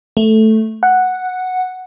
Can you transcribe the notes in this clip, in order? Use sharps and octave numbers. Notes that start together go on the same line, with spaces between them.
A3
F#5